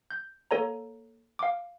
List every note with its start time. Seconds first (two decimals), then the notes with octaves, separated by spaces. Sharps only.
0.11 G6
0.51 A#3 A4 C#5 A#5
1.39 F5 D6